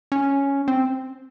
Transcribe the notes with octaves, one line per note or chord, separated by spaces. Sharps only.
C#4
C4